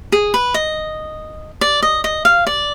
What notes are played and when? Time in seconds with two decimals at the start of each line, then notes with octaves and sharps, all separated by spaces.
0.12 G#4
0.34 B4
0.54 D#5
1.61 D5
1.82 D#5
2.04 D#5
2.25 F5
2.47 D5